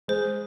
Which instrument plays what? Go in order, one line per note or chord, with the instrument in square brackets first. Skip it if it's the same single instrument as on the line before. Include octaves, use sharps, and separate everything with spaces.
[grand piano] G#3 [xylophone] C5